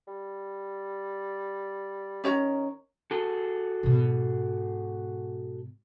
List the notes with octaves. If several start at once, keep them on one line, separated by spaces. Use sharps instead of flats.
G3
D#3 C#4 C#5 A#5
F#4 G#4 A4
G#2 B2